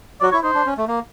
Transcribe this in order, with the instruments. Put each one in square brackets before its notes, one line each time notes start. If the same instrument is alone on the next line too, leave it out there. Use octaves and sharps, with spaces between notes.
[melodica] F#3 F#4 [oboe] D5
[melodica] E4 [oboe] C#5
[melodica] D#4 [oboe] C5
[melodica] D4
C#4
A3
A#3